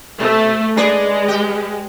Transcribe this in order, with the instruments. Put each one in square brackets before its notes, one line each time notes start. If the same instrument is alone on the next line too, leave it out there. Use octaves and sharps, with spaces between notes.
[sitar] B2 [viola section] A3
[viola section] G#3 [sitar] D4 G#4 B4
[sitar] G4